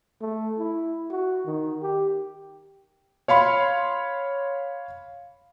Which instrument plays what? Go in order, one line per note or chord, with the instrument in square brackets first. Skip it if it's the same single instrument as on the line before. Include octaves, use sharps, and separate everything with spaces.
[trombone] A3
E4
F#4
D#3
G4
[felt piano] C#5 F5 B5 C6